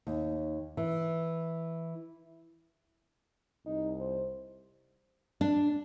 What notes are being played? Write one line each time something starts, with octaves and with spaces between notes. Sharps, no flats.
D#2
E3
C2 D#4
C5
D4